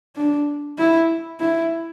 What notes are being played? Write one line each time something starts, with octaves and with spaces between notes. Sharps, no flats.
D4
E4
E4